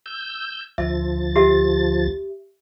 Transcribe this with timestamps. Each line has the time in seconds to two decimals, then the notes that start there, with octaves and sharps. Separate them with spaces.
0.06 E6 G6
0.78 D2 F3 E5 A6
1.36 G4 E5